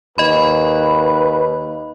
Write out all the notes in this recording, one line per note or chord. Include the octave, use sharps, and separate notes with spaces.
D#2 B4 D#5 B5